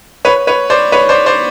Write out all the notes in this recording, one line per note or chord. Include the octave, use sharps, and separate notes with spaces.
B4 C#5
B4 C#5
C5 D5
B4 C#5
C5 D5
C5 D5